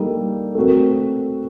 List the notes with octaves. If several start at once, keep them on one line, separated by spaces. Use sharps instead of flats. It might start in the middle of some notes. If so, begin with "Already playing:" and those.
Already playing: G3 A#3 D#4 A4
A3 C4 F#4 A#4